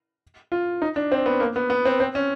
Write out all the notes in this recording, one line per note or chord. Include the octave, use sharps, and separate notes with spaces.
F4
D#4
D4
C4
B3
A#3
B3
B3
C4
C4
C#4